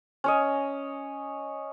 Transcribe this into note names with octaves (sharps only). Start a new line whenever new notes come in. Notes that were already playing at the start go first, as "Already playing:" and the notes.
C#4 C#5 D#5